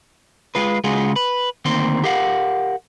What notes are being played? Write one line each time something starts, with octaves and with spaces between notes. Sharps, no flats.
G#3 F4 B4
C#3 G#3 F4 F#4 G#4
B4
D2 D#3 A#3 C4 C6
G4 A#4 F5 F#5